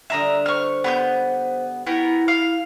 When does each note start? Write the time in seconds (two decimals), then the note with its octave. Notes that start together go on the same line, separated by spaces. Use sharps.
0.10 D3 G3 F4 E5 A#5 D#6
0.46 C5 C#6 F6
0.84 B3 G4 B4 C6 G6
1.87 B3 E4 A#4 C#5 G5
2.28 F5